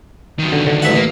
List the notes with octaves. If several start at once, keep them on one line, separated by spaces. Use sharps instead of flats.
D#3 F#3
D3
D3
A1 E5 F#5
A#3